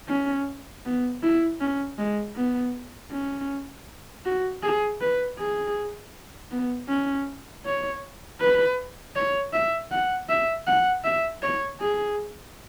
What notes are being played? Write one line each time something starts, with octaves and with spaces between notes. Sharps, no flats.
C#4
B3
E4
C#4
G#3
B3
C#4
F#4
G#4
B4
G#4
B3
C#4
C#5
B4
C#5
E5
F#5
E5
F#5
E5
C#5
G#4